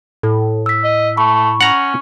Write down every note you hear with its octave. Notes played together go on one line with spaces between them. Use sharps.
A2 A4
E6 B6
D#5
A3 B5 C#6
C#4 F#5 A#5